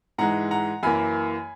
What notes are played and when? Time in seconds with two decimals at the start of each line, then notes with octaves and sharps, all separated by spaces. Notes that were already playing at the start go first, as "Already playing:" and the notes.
0.18 G#2 E3 G#3 F#5 A#5
0.51 F#5 A#5
0.83 F#2 E3 A#3 G#5 B5